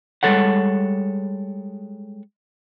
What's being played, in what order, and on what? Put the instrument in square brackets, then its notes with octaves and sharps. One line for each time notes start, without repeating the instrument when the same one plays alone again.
[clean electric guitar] G3 G#3 A4 C#5 F#5